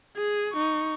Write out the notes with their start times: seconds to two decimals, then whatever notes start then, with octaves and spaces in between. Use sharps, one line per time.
0.16 G#4
0.53 D#4 C#6